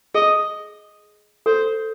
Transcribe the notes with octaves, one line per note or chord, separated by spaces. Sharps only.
G#4 D#5
A4 C5